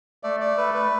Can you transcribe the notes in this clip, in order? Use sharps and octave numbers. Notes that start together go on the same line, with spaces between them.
A3 D5
D5
A3 B4
B4